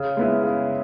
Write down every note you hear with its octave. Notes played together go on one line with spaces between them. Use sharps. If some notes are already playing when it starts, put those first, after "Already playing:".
Already playing: C#3
G#3 B3 E4
C#3